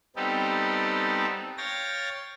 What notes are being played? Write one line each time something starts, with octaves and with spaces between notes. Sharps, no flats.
G3 B3 C4 D#4 G4 A4
C#5 F5 G5 A6 A#6